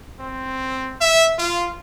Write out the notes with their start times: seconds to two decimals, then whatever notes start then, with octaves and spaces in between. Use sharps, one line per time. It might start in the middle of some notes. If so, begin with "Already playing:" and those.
0.20 C4
1.01 E5
1.39 F4